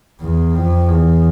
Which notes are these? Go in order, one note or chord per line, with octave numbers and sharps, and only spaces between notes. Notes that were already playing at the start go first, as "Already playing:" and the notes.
E2
F2
E2